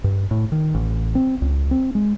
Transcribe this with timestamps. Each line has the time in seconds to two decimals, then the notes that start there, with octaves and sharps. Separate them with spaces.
0.04 G2
0.31 A2
0.52 D#3
0.74 A1
1.15 C4
1.42 C#2
1.71 C4
1.95 G#3